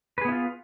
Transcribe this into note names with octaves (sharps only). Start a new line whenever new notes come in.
B3 E4 F4 G#4 B4